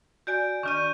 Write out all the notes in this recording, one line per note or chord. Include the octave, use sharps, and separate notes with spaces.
F#4 D5 G#5 G6 D7
D#3 D4 D5 C#6 F6 D#7